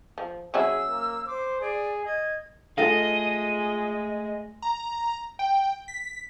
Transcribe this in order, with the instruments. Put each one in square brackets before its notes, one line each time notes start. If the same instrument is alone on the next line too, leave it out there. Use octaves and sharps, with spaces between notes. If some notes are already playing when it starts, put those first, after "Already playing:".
[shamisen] F3
[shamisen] F#3 C#4 E4 [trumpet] G#4 [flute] E6
[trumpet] A#3
[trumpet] C5 [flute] D6
[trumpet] G#4 [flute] D5
[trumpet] D#5 [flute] G#6
[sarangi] G#3 [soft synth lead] A3 [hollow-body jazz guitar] F4 A4 F5 [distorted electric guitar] D#5
[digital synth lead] A#5
G5
B6